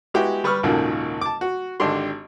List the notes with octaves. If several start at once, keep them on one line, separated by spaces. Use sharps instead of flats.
G#3 B3 E4 F#4 G4
G3 B4 C#6 D#6 F6
G#1 D#2 A#2 C#3 F#4 A4
A5 D6
F#4
G#1 D3 D4 G4 C6